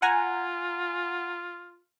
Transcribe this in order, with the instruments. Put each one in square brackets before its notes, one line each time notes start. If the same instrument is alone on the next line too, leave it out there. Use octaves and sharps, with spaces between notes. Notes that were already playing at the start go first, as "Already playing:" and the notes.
[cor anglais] F4 [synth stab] F#5 G#5 A#5